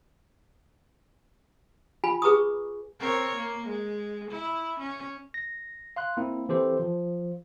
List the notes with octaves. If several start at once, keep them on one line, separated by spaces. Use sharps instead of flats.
F4 G#5 B5
G#4 B4 A#5 C#6 D#6
C4 A#4 C#5
A#3
G#3
E4
C#4
A#6
F5 C6 F#6
A#3 C4 E4
E3 C4 G4 A4 C5
F3